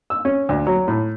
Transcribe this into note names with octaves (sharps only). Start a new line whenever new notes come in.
E6
C#4
D2
F#3
A2